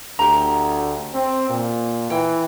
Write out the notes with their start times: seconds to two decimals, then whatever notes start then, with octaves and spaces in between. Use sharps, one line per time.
0.19 D2 G4 A#5
1.14 C4
1.50 A#2
2.10 E3 G5